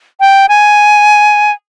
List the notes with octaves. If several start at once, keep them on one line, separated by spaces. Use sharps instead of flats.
G5
G#5